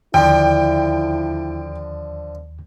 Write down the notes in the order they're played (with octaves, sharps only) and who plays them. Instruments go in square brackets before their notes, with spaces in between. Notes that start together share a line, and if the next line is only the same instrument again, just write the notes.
[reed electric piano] D#2 [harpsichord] D3 F3 [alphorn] E4 [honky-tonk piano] G5